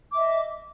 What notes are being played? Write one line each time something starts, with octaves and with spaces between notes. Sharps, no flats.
D#5 E5 D6